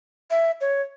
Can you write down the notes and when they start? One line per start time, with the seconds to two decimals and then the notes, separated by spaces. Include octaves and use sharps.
0.31 E5
0.61 C#5